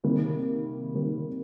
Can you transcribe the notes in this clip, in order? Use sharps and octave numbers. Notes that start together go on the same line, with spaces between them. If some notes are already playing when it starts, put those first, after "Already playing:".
C3 D#3 G3 A#3
C3 D#3 G3 A#3